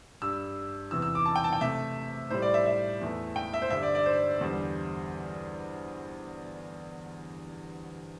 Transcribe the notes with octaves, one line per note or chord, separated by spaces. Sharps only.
G2 G3 E6
E2 C3 E3 E6
E6
D6
A5
G5
A5
G5
C3 A3 E5
A2 G3 C5
D5
E5
E5
E2 E3 A3
G5
E5
C5
G2 D3 G3 E5
D5
D5
C5
E2 D3 G3